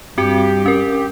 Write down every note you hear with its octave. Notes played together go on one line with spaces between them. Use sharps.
G2 C4 F#4 G4 C#7
C#4 A#4